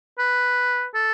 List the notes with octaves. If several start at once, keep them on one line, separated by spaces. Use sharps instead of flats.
B4
A4